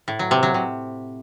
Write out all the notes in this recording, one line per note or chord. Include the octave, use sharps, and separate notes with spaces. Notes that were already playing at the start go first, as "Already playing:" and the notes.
A2
F#3
C3
F#3
C3